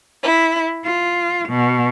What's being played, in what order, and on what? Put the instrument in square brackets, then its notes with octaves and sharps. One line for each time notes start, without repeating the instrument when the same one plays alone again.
[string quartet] E4
F4
B2